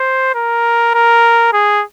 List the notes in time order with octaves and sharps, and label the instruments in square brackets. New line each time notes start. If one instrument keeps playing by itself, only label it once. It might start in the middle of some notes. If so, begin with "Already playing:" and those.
Already playing: [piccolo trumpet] C5
A#4
A#4
G#4